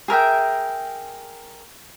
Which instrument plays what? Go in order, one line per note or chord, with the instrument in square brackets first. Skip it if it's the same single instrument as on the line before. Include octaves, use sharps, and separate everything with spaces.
[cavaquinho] G#4 A#4 E5 G5